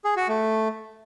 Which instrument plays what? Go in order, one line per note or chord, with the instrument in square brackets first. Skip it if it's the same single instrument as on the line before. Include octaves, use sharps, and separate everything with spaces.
[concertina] G#4
F#4
A3